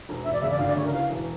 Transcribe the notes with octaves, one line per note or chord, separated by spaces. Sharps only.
E1
E1 E5
D5
C#3 E5
D5
D2 F5
D5
C#3 C#5
A#4
E3 F5
E1